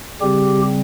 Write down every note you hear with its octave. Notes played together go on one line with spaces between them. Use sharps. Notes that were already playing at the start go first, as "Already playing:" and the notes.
C#3 G3 C4 G4